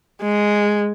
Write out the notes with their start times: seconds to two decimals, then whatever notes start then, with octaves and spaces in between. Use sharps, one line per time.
0.22 G#3